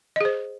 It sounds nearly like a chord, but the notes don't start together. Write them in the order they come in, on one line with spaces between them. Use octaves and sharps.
D#5 G#4 C5